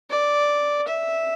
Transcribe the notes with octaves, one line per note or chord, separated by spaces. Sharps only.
D5
E5